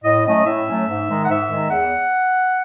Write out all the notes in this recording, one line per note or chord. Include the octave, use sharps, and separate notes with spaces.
A2 D#5
F#3 A3 C#4 D#5
A2 E5
F#3 A3 C#4
G#2
D#3 G#3 D#4
F#5
G#2 E5
D#3 G#3 D#4
E2 F#5